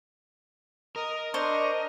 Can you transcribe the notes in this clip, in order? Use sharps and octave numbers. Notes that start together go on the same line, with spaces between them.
A#4 D#5 D#6
D4 C5 D#5 C#6